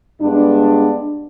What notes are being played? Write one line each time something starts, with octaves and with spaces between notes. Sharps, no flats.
G2 G#3 B3 D4